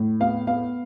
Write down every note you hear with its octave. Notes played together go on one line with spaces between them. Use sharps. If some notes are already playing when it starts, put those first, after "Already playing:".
Already playing: A2
B3 F5
B3 F5